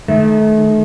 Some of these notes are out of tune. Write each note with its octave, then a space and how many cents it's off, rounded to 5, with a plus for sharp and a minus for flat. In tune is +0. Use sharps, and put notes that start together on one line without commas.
D#3 -10 A3 -35